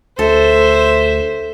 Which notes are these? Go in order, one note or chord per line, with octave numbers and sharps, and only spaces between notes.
D2 A4 C5 E5